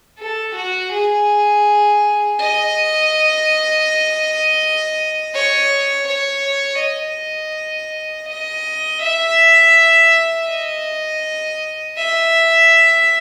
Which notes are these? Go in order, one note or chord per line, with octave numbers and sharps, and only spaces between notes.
A4
F#4
G#4
D#5
C#5
C#5
D#5
D#5
E5
D#5
E5